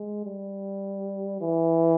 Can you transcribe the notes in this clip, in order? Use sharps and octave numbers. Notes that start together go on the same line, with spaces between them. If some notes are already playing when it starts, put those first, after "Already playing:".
Already playing: G#3
G3
E3